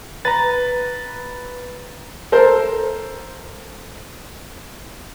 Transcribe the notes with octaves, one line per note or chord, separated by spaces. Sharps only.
B4 A#5 A6
A4 A#4 C5